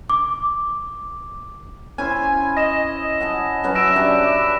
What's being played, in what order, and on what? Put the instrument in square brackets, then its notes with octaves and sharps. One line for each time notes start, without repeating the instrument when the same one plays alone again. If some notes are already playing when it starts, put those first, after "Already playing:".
[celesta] D6
[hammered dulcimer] C#4 E4 C5 [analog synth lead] G#5
[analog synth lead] D#5 [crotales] A#6 E7
[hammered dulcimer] F#5 G#5 A5
F#3 C#4 B4
[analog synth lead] E5 [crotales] A#6 D7 E7
[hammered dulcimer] D4 G4 D5